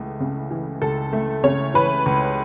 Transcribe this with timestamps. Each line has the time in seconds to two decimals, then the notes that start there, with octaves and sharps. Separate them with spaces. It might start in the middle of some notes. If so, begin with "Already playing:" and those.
Already playing: C#2 C#3 E3 A3
0.20 C#3
0.51 E3
0.82 C#2 A4
1.13 A3
1.44 C#3 C#5
1.74 E3 B4
2.06 C#2